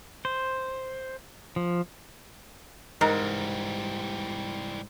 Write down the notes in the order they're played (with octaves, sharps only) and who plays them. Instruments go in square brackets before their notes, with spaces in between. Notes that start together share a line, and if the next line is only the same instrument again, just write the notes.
[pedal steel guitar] C5
F3
[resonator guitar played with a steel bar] G#2 [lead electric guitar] E3 G3 [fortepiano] A#4